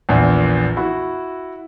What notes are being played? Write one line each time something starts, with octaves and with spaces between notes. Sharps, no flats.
A#1 E2
E4 F#4